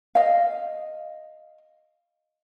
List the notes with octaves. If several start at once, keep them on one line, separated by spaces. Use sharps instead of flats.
D#5 F5